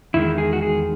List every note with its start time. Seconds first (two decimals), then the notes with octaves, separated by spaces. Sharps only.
0.14 E2 D#3 G#3 E4
0.38 G#4
0.53 F#4
0.62 G#4